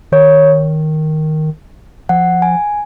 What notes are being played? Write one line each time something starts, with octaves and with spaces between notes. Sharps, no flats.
D#3 C#5
F3 F#5
G#5